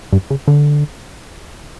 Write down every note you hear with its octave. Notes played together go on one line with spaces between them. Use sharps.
G2
C#3
D3